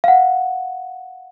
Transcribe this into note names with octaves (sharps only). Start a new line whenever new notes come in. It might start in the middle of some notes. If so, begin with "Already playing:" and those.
F5 F#5